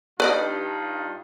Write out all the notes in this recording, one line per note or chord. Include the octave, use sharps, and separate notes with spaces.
G2 D#4 F4 B4 D5 D#5